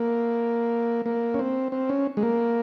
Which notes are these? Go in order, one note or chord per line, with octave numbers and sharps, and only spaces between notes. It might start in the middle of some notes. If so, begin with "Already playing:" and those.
Already playing: A#3
A#3
C#4
C4
C4
C#4
G#3
A#3